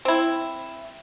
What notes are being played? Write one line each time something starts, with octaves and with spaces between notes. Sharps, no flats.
C4 E4